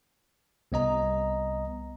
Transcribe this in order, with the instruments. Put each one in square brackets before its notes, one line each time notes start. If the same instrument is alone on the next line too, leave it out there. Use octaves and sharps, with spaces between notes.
[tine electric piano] C2 B3 D#5 A#5